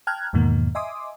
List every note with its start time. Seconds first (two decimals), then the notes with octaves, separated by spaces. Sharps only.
0.07 G5 A5 A#5 F6 F#6 G#6
0.33 E2 G#2 B2 D#3 A#3
0.75 D#5 E5 G#5 C6 D6 D#6